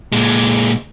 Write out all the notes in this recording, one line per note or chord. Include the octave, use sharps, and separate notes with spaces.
A#2 G#3